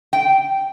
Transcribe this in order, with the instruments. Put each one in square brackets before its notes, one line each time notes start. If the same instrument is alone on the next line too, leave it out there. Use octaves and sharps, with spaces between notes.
[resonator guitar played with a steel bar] G5